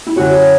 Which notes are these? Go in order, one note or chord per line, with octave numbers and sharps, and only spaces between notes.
E4
F#2 D3 F#3 F#4
F#4